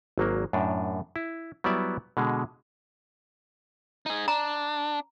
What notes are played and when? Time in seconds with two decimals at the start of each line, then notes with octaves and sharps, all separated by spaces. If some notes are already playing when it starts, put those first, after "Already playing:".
0.18 G#1 F#3 A#3
0.53 F#2 A2 D4
1.16 E4
1.64 F#3 G3 B3 E4 D5 E5
2.17 B2 D3 G#3
4.06 D#4 G#4
4.28 D4 A#5